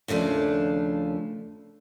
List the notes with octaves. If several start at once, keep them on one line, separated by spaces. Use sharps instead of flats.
D#2 C#3 F3 A3 D4